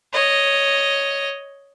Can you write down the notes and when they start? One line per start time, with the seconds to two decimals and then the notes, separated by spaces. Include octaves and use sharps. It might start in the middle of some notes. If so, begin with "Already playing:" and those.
0.13 C#5 D#5